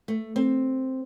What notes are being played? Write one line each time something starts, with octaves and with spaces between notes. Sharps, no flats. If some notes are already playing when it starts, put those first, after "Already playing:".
A3
C4